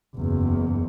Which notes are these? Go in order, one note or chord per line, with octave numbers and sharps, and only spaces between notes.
F#1 E2